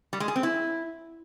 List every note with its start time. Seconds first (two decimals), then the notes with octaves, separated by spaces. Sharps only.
0.13 G3
0.20 G#3
0.28 G#4
0.36 C4
0.43 E4